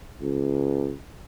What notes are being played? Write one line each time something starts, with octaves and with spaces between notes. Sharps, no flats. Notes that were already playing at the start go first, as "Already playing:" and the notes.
C#2